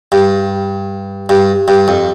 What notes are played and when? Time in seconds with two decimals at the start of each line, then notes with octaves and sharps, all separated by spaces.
0.12 G2
1.29 G2
1.68 G2
1.88 F2